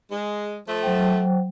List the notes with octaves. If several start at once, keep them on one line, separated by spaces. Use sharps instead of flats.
G#3
F3 A3
F#3 C5 G5